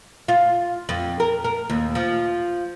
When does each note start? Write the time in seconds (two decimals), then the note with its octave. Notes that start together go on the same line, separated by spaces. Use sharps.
0.28 F4
0.89 F2
1.20 A#4
1.44 A#4
1.70 D#2
1.95 F3